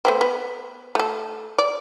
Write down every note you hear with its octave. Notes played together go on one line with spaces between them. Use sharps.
A3 B3 C4
B3
A3 A4
D5